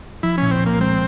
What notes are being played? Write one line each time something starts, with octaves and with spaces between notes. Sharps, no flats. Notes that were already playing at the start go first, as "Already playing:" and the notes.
F3 E4
A#2 C#4
C4
C2 A#3
G#3 C4